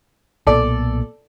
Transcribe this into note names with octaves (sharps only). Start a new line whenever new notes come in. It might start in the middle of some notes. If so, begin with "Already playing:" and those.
B1 A#2 B3 A4 D5